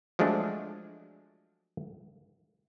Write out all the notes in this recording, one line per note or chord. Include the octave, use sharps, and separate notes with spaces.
F3 F#3 G#3 A3 D4